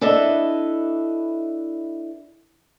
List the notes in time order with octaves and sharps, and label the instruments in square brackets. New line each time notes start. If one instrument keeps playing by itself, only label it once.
[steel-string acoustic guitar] D4 E4 A4 B4 D#5 E5